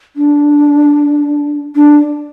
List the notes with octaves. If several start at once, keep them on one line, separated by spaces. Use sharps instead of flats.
D4
D4